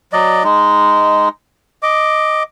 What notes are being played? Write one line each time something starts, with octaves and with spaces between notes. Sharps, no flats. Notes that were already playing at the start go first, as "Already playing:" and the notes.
F#3 D5 D#5
G#3 D#4
D#5 D6